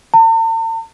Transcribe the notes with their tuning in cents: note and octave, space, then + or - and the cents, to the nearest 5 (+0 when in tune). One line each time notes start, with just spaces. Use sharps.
A5 +45